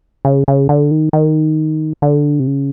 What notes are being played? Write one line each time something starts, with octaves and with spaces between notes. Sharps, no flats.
C#3
C#3
D3
D#3
D#3
D3
C3
C#3